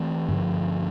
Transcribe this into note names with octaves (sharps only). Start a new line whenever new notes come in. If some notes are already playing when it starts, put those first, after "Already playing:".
Already playing: E3 A3 C4
G2 D3 F3